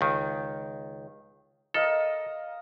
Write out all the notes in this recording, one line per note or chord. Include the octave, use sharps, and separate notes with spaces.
C#2 D#3
A4 A#4 D#5 F5